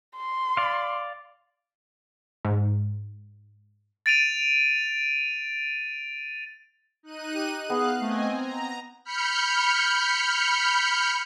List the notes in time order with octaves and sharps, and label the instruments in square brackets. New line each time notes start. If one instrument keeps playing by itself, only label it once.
[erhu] C6
[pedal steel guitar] D5 F5
[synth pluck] G#2
[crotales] A6 D7 D#7 F7
[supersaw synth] D#4 F#6 D#7
[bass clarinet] G4
[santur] B3 [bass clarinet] G#4 [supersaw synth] F5 F#6
[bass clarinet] A3 [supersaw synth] C4 D#5 G#5
[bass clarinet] C4 [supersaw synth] A#5
[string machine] B5 F6 G6 C#7